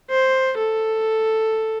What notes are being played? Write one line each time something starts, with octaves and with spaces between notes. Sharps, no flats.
C5
A4